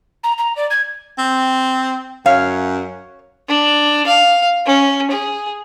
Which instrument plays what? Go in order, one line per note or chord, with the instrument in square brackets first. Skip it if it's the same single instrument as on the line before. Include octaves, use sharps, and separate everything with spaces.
[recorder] A#5
A#5
D5
G#6
[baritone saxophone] C4
[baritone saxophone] F#2 [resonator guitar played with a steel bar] C#5 F5
[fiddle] D4
F5
C#4
G#4